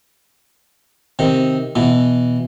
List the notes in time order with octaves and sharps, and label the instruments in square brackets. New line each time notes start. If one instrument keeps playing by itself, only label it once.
[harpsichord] C3 D#3
B2 E3